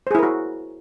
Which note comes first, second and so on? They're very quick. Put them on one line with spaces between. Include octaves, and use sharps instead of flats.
C5 G#4 E4 A#4 F#4